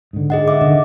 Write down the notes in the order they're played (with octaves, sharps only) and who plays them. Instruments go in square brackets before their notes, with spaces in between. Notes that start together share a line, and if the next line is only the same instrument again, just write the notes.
[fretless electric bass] G#2 D3
[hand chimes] G#4 D#5 F#5
E5 D6
[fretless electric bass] D3 D#3 [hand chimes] D#5